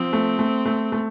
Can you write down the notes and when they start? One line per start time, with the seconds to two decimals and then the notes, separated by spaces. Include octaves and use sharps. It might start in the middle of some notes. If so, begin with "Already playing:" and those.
Already playing: F3 C4
0.13 A3
0.39 A3
0.66 A3
0.92 A3